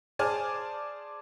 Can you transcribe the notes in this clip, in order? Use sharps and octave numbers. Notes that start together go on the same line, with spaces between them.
G#4 C5 D5 G#5 A5 F6